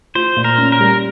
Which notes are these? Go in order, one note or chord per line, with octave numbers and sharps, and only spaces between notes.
F4 C5
A#2
A#4
C#4
A#4
G3